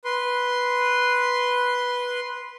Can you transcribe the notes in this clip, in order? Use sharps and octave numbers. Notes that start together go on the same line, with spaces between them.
B4 C6